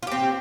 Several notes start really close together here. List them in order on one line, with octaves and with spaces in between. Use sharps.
F4 G4 C4